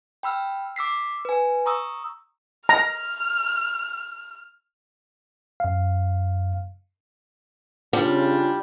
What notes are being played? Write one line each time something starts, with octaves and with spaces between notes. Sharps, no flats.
G5 B5 E6 F6
D6 E6 B6 C7
B4 G#5
A#5 C#6 D#6 E6
A#5 F6
F#2 F5
C#3 G3 D4 F4